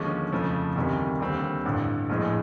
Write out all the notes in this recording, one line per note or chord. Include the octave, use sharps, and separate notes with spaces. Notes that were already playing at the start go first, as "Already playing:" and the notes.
Already playing: D#2 D3 F3 G#3 C#4
F2 C#3 F3 A3
D2 C3 D#3 G3
D#2 D3 G3 C4
A1 G2 D3
A#1 A2 F3 G#3